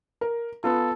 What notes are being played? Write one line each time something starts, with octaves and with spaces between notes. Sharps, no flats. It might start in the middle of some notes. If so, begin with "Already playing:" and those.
A#4
B3 F4 A4